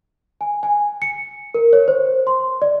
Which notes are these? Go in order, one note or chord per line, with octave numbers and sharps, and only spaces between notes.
G#5
G#5
C#7
A#4
C#5
C5
C6
D5